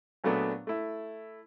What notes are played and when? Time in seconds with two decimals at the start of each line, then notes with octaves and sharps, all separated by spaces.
0.24 A#2 F#3 A3 B3 D4 G#4
0.67 A3 E4